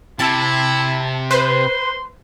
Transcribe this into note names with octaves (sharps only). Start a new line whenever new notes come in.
C3 E4 A5
B4 C5 C6